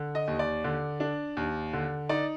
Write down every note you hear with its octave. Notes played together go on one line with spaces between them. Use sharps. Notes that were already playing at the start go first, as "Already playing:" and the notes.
Already playing: D3
D#5
D#2
D5
D3
D4
D#2
D3
D#4 D5